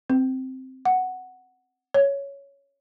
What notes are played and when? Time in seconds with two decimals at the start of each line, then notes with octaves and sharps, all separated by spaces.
0.10 C4
0.85 F#5
1.94 C#5